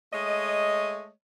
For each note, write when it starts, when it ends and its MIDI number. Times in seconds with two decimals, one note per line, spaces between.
0.12 1.08 56
0.12 1.08 57
0.12 1.08 73
0.12 1.08 75